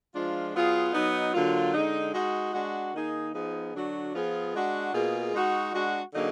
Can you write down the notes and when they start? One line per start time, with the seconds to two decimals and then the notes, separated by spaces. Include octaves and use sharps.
0.13 F3 G#3 D4 F4
0.53 F#3 B3 F4 G#4
0.93 F#3 B3 D#4
1.33 D3 F#3 A#3 F4
1.73 D3 G#3 D#4
2.13 G#3 D#4 F#4
2.53 G#3 D4 F#4
2.93 D#3 A#3 D#4 G#4
3.33 F3 B3 D#4 G#4
3.73 D3 F#3 D4 F#4
4.13 F3 B3 F4 G#4
4.53 G#3 D4 F#4
4.93 B2 A#3 F4 G#4
5.33 G#3 D#4 F#4
5.74 G#3 D4 F#4
6.13 D3 F#3 A#3 D#4 G#4